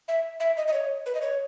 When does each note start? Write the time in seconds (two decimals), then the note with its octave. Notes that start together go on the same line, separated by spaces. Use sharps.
0.08 E5
0.40 E5
0.57 D#5
0.67 D#5
0.73 C#5
1.06 B4
1.15 D#5
1.22 C#5